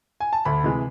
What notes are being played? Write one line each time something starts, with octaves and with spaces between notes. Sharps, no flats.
G#5
A5
D2 B5
C3 E3 G#3